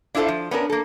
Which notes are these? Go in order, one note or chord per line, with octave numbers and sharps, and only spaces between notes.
D4 E4 F4 G#4 A4 C5
F3
B3 C#4 D4 A#4
A#3 A4